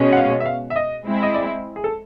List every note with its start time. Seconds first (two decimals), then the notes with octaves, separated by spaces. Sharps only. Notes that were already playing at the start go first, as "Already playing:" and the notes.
Already playing: B2 G#3 C#4
0.13 F#5
0.17 F5
0.40 E5
0.46 F5
0.70 E5
0.76 D#5
1.05 G#3 C4 E4
1.23 D#5
1.34 D5
1.76 G#4
1.84 A4